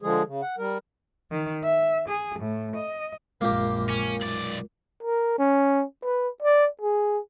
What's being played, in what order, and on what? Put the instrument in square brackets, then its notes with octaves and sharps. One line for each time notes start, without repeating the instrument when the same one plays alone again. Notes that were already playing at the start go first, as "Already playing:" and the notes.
[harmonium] D3 F3 G#3 G#4
C#3
F#5
G3 A#4
[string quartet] D#3
E5
G#4
A2
D#5
[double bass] A#1 F#2 [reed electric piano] G#3 F4 A#4 [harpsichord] A#3 G4
[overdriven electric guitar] C#4
B1 D5
[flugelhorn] A#4
C#4
B4
D5
G#4